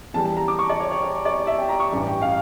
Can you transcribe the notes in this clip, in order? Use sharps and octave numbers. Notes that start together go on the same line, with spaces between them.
E2 E3 G3 A5
A5
A#5
D6
C#6
D5
C#5
C#5
C#5
D5
E5
G5
A#5
C#6
A1 G2 E3 G3
G5
F5